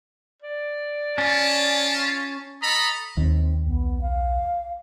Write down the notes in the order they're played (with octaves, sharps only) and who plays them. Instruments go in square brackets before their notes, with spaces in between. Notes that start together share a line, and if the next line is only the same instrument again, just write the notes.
[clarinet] D5
[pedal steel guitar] C#4 [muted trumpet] F4 [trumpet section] A5
[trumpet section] A4 D#5 [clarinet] A#5 [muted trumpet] B5
[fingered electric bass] D#2 [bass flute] C4
[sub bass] B1 [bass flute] B3
[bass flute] F5